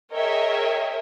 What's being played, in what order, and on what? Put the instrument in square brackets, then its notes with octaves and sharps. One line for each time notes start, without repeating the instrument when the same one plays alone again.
[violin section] G#4 A#4 C#5 D#5 E5 G5